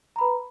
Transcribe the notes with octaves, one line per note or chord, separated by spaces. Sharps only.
B4 A#5 B5